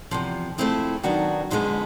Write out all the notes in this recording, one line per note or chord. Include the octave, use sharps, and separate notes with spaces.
E2 C3 F3
F3 A3 C4 E4 G#4
D#3 F#3 B3 D4 F#4
F2 D3 F3 G#3 B3